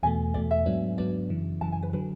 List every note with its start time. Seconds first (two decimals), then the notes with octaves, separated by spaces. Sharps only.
0.03 E2 B2 A3 G#5
0.34 E2 B2 A3 D5
0.51 E5
0.66 G#2 F#3 B3 D4
0.98 G#2 F#3 B3 D4 D5
1.29 F#2 C#3 E3
1.61 F#2 C#3 E3 A5
1.72 G#5
1.83 B4
1.93 D3 F#3 B4